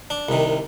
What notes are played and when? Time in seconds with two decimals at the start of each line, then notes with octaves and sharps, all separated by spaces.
0.10 D4
0.29 C2 C3 D#3